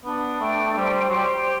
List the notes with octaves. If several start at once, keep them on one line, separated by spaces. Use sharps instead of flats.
B3 D4
A3 G5
A3
G3 C5
G3
F#3
G3 G4